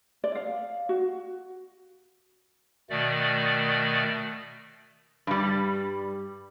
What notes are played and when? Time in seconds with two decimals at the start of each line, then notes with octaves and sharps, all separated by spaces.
0.24 D5
0.35 F5
0.89 F#4
2.90 B2 D#3 A3 D5
5.27 G2 G3